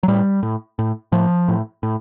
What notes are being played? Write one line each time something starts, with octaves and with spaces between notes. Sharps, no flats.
F#3
A2 G3
A2
A2
A2 F3
A2
A2